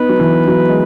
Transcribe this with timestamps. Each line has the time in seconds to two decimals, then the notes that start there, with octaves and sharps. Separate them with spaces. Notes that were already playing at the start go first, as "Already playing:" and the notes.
Already playing: B3 D#4 B4
0.09 F#3
0.20 E3
0.48 F#3
0.69 G#3